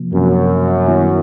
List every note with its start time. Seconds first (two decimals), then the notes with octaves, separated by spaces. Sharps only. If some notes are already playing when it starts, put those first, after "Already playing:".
Already playing: C3 F3 A#3
0.13 F#2 C3 F3 A#3
0.87 D#3 G3 B3 E4